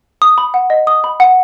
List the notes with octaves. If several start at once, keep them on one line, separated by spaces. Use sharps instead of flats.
D#6
B5
F#5
D#5
D#6
B5
F#5